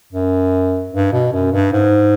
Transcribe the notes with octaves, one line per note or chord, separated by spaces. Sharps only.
F#2
G2
B2
F#2
G2
G#2